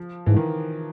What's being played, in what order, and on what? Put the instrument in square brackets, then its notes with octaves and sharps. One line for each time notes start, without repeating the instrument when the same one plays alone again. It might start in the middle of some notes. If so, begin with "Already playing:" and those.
Already playing: [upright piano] F3
[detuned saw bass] G#2 [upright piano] E3
[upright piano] D#3